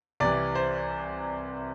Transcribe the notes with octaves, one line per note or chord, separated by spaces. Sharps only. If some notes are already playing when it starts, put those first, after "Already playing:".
C2 C3 E3 D5
C5